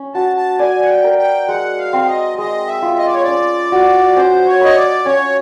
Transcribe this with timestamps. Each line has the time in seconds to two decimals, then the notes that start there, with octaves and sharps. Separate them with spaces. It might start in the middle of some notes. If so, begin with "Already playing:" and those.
Already playing: C#4
0.14 F#4 A5
0.37 A5
0.59 D5 G#5
0.84 F#5
0.89 G5
1.04 A#4
1.18 G5
1.48 G#3 F#5
1.78 F5
1.93 C4
2.07 D#5
2.38 G#3 D#5
2.67 E5
2.82 F4
2.98 D#5
3.06 D5
3.15 C#5
3.23 C#4 D5
3.72 F#4
4.16 C#4 C5
4.47 C#5
4.61 B4 D#5
4.75 D5
5.06 C#4 C#5